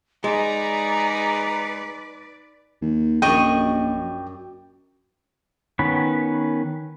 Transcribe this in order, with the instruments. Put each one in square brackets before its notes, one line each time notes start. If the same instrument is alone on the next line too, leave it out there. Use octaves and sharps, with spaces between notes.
[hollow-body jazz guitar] G#3 [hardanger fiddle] D#4 G#4 [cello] B4 D5 [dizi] A#5
[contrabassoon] D#2
[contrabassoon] A#1 [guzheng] F#2 D4 [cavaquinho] D#5 C#6 [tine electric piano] G5
[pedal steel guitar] D#3 B3 C#4 B4